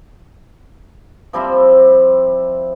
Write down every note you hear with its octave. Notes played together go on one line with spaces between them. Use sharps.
F3 G3 C4 E4